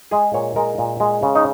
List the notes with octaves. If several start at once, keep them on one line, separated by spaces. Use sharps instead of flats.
G#3 G#4
A#2 C#5
G#3 A#4
A#2
G#3
C#3
D#4